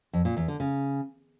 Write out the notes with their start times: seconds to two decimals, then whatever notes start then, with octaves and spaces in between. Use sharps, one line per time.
0.13 F2
0.25 A#2
0.37 E2
0.48 D3
0.60 C#3